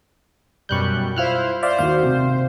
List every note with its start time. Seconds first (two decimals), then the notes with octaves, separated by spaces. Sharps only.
0.69 F#2 B2 G3 C#6 F#6 G6
1.16 E4 F4 C5 F6 F#6
1.63 C5 D5 E5 F5
1.79 D#2 F#4 F5
2.03 C3